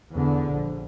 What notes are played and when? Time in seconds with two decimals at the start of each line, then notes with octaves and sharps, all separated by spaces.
0.12 E2 D3
0.52 A#1